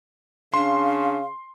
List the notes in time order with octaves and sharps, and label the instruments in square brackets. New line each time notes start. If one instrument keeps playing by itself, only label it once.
[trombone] C#3 [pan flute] D4 [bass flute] F5 [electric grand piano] C6